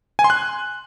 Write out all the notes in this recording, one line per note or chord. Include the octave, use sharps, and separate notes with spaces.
G#5
C6
F#6